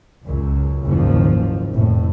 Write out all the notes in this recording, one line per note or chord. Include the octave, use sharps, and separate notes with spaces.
C#2 F#2
F#1 D#2 G#2 F3
F1 A2